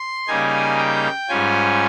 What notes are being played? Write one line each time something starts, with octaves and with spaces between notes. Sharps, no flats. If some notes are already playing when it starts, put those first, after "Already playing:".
Already playing: C6
C#3 G3 A#3 D#4 G#5
G5
G#2 G3 C#4 F4 G#5